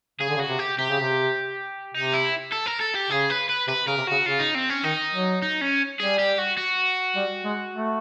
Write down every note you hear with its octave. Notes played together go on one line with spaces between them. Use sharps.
C#3 G#4
D3
C#3
F#4
C3
G4
C3 G4
C#3
C3
C3 D#4
E4
A4
A#4
A4
G4
C#3 G#4
B4
B4
C3 B4
C#3 A#4
C3
C#3 F#4
C#3 F4
D#4
C4
C#4
D#3 D#4
F#3
D#4
C#4
G3 G#4
G4
F#4
F#4
G3
G#3
A3